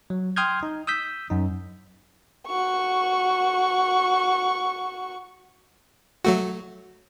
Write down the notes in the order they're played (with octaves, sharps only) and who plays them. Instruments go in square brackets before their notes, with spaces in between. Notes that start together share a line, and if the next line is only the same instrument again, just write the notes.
[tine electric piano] F#3
G5 C6 D#6 F6 G6 G#6
D#4
D#6 E6 G6 B6
F#2 D#4
[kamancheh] F#4 C#6
[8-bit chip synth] F#3 A3 F#4